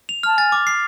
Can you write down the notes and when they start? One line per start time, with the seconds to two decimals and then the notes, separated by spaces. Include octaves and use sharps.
0.09 F7
0.23 A5 F6
0.37 G#5 A6
0.52 D6
0.67 C7